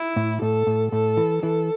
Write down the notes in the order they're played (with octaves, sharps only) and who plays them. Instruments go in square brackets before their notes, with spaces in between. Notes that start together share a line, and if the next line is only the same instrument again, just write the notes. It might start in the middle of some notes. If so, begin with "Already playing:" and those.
Already playing: [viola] E4
[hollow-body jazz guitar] A2
[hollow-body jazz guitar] A2 [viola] A4
[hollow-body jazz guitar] A2
[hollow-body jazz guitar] A2 [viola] A4
[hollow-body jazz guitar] E3
[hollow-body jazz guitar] E3 [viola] A4